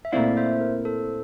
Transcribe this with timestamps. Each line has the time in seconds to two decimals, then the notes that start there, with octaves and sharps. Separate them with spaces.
0.05 E5
0.12 A#2 A3 C4 E4 D5 F5
0.37 C5 E5
0.61 A#4
0.85 A4 C5